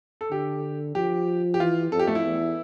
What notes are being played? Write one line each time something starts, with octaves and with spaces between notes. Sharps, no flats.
A4
D3 G4
F3 G4
G4
E3 F4
F2 A4
G4
A3
E4
E2